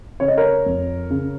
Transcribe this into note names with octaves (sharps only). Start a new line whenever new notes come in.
C#3 C#5
D#5
A#4 C#5
F2
C#3